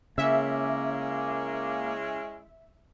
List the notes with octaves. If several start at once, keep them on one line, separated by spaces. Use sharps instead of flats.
C#3 G#3 A#3 C#4 E4 E5